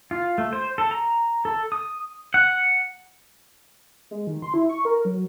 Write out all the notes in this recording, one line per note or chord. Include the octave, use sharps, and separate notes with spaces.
F4
A3
C5
A4
A#5
A4
D#6
F#5
G#3
D#3
C6
E4
C#6
A#4
F#3